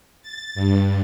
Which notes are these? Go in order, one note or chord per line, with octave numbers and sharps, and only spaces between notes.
A6
G2